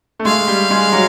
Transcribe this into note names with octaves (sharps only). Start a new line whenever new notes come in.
A3
G#3 F5
G3
G#3
F#3